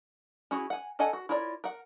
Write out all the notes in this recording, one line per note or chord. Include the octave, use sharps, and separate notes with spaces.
C#4 E4 F#4 G#4
F#5 G#5
D4 A4 D#5 F#5 G#5
F#4
E4 F4 A#4 C#5 D5
A#4 F#5